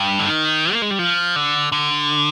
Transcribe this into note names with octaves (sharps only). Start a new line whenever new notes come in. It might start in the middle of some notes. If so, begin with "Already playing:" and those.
Already playing: G2
D3
D#3
A#3
G#3
G3
F3
D3
D3